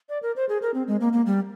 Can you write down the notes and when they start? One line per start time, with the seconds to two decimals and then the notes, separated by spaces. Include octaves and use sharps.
0.09 D5
0.23 A#4
0.36 C5
0.49 G#4
0.62 A#4
0.74 C4
0.88 G#3
1.01 A#3
1.13 A#3
1.26 G3